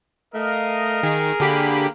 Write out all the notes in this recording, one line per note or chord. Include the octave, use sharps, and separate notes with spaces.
A3 A#4 D#5 F5
D#3 G#4
D3 A#3 G4 B5